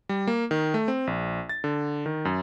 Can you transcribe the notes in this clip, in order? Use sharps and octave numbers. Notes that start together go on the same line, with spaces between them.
G3
A#3
D#3
A3
C4
A#1
A6
D3
D#3
F#2